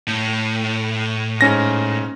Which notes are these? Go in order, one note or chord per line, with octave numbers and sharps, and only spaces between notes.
A2
G#2 C#4 A#6